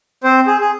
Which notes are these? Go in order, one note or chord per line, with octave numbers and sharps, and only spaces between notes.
C4 C5
G#4
G#4